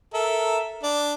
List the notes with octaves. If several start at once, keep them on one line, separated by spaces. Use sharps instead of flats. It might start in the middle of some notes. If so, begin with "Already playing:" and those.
A4 A#4 E5
D4 D5